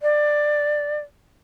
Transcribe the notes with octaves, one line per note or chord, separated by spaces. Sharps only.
D5